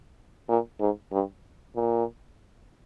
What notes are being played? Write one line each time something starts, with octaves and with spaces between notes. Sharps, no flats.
A#2
G#2
G2
A#2